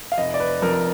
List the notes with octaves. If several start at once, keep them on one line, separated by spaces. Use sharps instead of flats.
F5
F1 D#5
D5
B4
F2 A#4